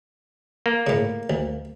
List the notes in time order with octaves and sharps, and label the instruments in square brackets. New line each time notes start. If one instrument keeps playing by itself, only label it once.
[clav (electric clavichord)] A#3
[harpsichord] A2 C#3
D2